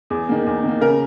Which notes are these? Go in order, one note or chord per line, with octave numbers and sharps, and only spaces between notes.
E2 G#4
D#3 A#3
E2
D#3 A#3
C#3 A#4